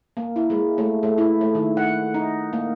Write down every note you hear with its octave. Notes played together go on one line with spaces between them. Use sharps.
A#3
E4
G#3
A3
A3
E4
A3
D#3
F#5
D#4
A#3